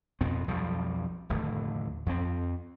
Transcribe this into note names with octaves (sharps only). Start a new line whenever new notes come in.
F2 B2 B3 C4
B1 F2 F3 G3
F1 D#2 A2 D3
F2 F3 C4